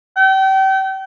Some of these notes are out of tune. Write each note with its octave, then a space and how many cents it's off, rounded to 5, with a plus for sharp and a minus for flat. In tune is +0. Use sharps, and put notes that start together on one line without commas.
G5 -35